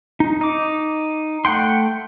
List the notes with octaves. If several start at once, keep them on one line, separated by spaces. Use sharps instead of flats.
D#4
D#4 D6
A3 F#5 G5 C6